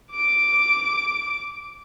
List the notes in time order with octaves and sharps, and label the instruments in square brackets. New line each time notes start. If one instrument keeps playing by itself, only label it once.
[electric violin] D6 D7